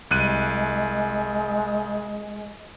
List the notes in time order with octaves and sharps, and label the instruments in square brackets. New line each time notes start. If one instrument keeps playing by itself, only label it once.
[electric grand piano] C2 F#6 D#7 [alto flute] G#3